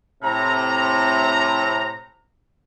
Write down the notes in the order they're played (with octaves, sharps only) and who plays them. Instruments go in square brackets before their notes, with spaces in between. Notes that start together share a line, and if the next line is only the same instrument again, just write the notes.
[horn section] A2 C3 A#5